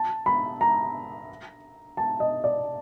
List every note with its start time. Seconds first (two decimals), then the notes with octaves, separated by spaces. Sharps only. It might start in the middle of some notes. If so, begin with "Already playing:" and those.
Already playing: A5
0.26 B5
0.61 A#5
1.97 A5
2.20 D#5
2.44 D5